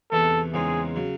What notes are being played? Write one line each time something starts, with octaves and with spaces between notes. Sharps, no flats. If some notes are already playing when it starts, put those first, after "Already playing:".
E2 C3 E3 A3 A4
E2 C#3 G#3 C4 D#4 G#4
C#3 F#3